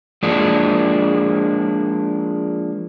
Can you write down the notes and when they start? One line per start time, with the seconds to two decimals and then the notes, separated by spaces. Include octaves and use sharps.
0.23 F3 G#3 A#3 D4